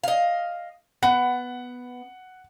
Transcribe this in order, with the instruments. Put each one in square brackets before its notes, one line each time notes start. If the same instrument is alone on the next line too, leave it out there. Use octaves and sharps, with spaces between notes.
[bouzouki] D#5 F5
[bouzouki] B3 [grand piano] F#5